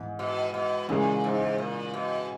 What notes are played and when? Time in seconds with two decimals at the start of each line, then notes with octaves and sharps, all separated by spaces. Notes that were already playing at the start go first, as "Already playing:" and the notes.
Already playing: G#2 E3 B3
0.19 B2
0.54 B2
0.89 A#2 C#3 E3 G#3
1.24 G#2
1.58 A#2
1.94 B2